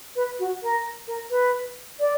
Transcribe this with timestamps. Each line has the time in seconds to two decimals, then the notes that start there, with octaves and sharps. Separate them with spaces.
0.15 B4
0.39 F#4
0.62 A#4
1.07 A#4
1.30 B4
2.00 D5